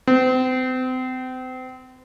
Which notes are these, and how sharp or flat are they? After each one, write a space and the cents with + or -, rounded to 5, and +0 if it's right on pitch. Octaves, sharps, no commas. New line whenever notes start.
C4 -35